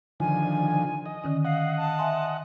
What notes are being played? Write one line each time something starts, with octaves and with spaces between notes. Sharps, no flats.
D3 D#3 F3 G#5
D#5
D3 D#3 C#4
D#5 F5 F#5
A5
E5 G#5 C6